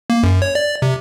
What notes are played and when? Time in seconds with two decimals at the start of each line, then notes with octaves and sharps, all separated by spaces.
0.10 A#3
0.23 F#2
0.42 C#5
0.55 D5
0.82 C3